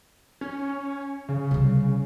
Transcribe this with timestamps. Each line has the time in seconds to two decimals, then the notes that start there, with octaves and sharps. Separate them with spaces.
0.41 C#4
1.29 C#3
1.51 C3 G3